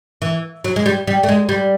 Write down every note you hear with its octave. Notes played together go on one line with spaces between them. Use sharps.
E3
F#3
G#3
G3
G3
A3
G#3
G3